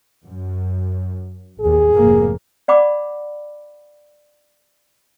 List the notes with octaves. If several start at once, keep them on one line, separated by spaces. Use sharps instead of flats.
F#2
A1 D#2 G#4
F1 G#2 A#3
D5 F#5 B5 D6